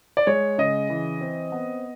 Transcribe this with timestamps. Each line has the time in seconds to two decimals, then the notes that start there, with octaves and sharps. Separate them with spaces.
0.17 D5
0.27 G#3 C#5
0.58 C#3 D#5
0.90 E3
1.21 C4
1.52 B3